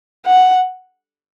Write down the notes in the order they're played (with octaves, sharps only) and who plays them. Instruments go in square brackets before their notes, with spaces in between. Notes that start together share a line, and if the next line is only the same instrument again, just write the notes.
[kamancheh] F#5